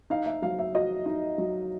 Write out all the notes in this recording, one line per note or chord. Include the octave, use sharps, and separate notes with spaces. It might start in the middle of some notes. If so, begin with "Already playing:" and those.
D#4 F5
E5
F#3 F5
E5
F#4 D#5
D#4
F#3